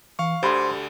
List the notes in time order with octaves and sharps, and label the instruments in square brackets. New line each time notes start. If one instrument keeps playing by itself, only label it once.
[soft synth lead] E3 [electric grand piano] F5 C#6
[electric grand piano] D2 D3 [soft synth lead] G4 [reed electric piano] C5 B5 C6